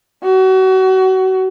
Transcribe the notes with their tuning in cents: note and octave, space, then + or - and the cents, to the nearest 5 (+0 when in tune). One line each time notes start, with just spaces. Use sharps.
F#4 +30